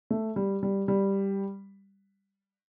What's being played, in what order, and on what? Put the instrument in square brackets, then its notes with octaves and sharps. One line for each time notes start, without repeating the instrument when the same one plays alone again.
[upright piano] A3
G3
G3
G3